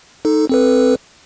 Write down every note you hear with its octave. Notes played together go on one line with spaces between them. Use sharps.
D#4 A4
C4 A4 B4